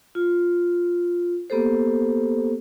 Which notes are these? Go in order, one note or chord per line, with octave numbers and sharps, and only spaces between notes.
F4
A#3 B3 G4 A4 C5